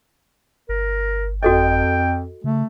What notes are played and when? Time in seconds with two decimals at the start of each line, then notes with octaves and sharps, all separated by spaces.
0.69 G1 A#4
1.43 F2 F#4 A4 D#5 G5
2.44 C#3 A3